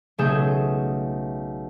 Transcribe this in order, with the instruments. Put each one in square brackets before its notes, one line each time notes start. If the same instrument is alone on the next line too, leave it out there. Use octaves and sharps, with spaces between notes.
[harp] B1 C#3 A3 G#4 G6 E7